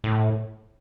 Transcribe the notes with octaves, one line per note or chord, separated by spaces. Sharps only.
A2